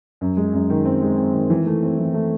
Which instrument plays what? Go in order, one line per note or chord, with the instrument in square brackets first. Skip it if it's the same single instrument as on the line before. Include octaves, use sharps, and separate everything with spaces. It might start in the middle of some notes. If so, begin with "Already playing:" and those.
[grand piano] F#2
G#3
F#2
D#3
C4
G#3
C4
D#3
E3
A3
C4
E3
A3